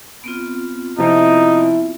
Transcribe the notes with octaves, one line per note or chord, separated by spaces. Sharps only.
B3 C4 F4
C3 F3 D#4 E4